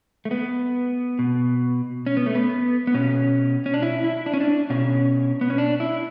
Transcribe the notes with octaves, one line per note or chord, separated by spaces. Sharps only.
A3
B3
B2
C#4
B3
A3
B3
B3
B2 C#4
C#4
D4
E4
E4
D4
C#4
D4
B2 C#4
B3
C#4
D4
E4